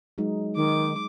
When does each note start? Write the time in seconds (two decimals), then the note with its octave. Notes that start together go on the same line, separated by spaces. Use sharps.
0.18 F#3 G#3 D#4
0.56 D#3 D6